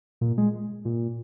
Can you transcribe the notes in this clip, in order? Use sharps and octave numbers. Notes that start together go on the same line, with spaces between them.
A#2
G#3
A#2